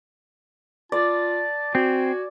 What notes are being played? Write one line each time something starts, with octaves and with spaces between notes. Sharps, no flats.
F4 D5 A5
C4 F#4 G#5